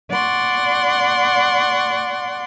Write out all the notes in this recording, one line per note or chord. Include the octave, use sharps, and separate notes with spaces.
D5 F#5 C6 C#6